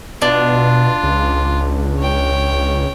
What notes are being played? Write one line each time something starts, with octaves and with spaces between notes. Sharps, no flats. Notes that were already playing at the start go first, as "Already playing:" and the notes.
B2 D4 F4
C#2
C#5 G5